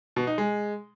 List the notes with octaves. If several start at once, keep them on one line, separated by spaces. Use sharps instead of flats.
B2
D#4
G#3